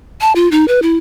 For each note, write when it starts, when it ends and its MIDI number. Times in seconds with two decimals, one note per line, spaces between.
0.21 0.32 81
0.36 0.50 65
0.51 0.65 63
0.68 0.82 71
0.82 0.98 64